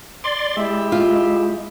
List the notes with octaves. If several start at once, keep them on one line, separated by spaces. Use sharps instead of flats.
D5 C6
G#3 E4 G4 E5
F4